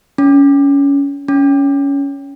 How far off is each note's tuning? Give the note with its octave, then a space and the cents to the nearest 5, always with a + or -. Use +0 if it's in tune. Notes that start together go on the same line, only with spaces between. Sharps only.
C#4 +20
C#4 +15